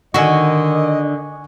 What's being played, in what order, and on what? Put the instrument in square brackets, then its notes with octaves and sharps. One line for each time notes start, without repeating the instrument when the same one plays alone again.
[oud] D3 F#4 [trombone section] D#3 [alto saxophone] D#5 [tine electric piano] G#5 C#6